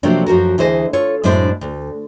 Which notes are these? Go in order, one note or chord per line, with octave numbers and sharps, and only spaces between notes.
C3 F3 F#3 A3 A#3 D4
F#2 F3 F#4 A#4
D2 E3 G#4 C5 D#5
F4 A4 C#5
F#2 A2 G#3 D4 C5 E5
D2